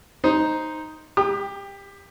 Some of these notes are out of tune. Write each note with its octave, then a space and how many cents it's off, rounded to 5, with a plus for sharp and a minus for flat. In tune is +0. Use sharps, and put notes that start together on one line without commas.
D#4 +0 C5 +0
G4 +20 D#6 -45